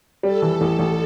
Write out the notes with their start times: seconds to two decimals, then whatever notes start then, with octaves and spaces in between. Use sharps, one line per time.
0.23 G3 A4
0.42 E3
0.61 A1
0.79 A1